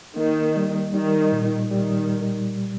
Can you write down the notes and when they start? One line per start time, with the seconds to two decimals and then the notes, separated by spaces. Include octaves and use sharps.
0.16 D#3 A#3
0.56 G3
0.94 D#3 G3
1.32 A#2
1.71 D#3 G3